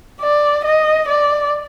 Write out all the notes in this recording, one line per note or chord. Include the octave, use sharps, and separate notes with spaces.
D5
D#5
D5